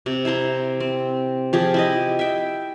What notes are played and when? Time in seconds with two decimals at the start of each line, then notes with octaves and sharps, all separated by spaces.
0.06 C3
0.25 E4 C5 A#5 C6
0.80 C4
1.53 F3 G4 G#4
1.74 E4 G4 D#5
2.19 E5 G5